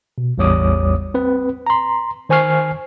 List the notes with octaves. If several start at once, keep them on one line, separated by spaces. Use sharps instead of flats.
B2
A1 E2 G3 C#5 D6 D#6
C4 B4
A#5 C6
D#3 C5 G#5 C#6 F6 C7